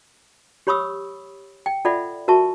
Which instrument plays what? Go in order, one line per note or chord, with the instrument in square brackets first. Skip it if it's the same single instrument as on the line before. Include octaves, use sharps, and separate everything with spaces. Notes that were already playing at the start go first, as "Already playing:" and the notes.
[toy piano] G4 C#5 B5 C#6 D#6 E6
G5
F4 A4 D5 E5 F#5 B5
F#4 A#4 E5 A5 C#6